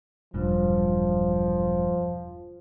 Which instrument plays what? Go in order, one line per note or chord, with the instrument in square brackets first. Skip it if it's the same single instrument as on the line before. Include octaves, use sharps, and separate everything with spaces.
[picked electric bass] E1 G2 [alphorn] F3